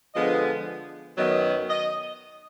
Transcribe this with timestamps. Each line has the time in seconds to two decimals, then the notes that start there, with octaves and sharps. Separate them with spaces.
0.15 D3 F3 G#3 B3 D#5
1.17 F#2 D#3 F#3 B3 D#5
1.69 D#5